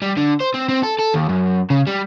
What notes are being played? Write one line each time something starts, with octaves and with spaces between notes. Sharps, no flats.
G3
D3
C5
C4
C4
A4
A4
D#2
F#2
C#3
G3